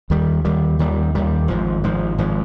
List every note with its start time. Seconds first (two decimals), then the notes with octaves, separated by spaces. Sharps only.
0.10 D#2 D#3 G3
0.45 D#2 D#3 G3
0.79 D#2 D#3 G3
1.15 D#2 D#3 G3
1.48 G#1 G#2 F3
1.83 G#1 G#2 F3
2.18 G#1 G#2 F3